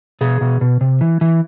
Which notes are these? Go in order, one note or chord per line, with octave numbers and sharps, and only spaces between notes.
B2 G#4
B2
B2
C3
E3
E3